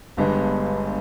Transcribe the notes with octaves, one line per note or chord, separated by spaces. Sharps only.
G1 G2 D3 G#3 B3